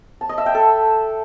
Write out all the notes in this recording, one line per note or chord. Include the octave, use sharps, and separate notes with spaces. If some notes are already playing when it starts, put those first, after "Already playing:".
A5
D#5
E5
G5
A4